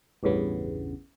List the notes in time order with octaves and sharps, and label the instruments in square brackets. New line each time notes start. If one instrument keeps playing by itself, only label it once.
[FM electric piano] A1 E2 G2 C#3 B3